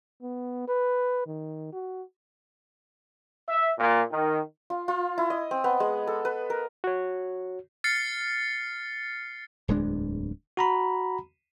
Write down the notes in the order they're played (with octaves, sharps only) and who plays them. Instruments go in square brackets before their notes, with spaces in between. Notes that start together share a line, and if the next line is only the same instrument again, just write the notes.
[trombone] B3
B4
D#3
F#4
[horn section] E5
A#2
D#3
[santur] F4
F4
E4
D#5
C4
B3
G#3
A4
B4
A#4
[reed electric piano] F#4 C#5
[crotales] F6 A6 C7 C#7
[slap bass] D1 E2 G#3 D4
[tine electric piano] F#4 A#5 B5